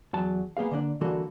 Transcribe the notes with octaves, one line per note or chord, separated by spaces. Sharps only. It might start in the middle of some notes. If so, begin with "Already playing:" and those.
E2 F#3 A5
A#3 B3 G#4 F5
D3 A#3 B3 D4
D3 E3 G3 A#3 F#4 A4